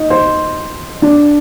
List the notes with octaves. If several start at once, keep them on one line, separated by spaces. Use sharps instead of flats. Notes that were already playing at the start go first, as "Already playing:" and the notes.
Already playing: D#4
C5
D4